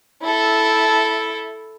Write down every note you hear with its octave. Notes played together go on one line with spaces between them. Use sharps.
E4 A4